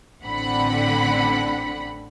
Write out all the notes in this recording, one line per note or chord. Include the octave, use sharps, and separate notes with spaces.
A1 D3 C4 F#5 B5